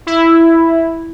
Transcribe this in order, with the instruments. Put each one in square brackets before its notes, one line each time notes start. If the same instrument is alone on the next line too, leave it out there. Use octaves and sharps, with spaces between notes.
[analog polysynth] E4